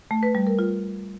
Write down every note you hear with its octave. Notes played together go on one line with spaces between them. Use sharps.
A3
B4
G3
A#4
F4